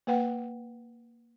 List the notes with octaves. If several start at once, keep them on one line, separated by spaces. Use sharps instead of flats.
A#3 B4 F#5 G5